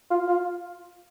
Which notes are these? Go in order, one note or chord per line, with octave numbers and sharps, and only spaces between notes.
F4
F4